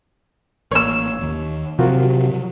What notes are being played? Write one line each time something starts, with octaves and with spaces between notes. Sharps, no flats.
A1 A#3 C#5 E6
D#1 D#2
C3 F3 F#3 F4 F#4 A#4